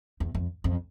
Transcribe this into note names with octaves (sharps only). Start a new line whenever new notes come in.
E2
F2
F2